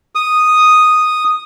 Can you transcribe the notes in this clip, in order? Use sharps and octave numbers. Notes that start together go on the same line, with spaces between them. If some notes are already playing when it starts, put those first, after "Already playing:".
D#6